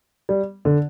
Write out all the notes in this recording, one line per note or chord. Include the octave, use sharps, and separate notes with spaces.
G3
D3